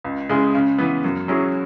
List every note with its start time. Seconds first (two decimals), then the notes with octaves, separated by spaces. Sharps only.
0.04 C#2
0.29 C#3 G#3 E4 G#4
0.55 C#3
0.78 E3 B3
1.04 F#2
1.28 F#3 C#4 E4 G#4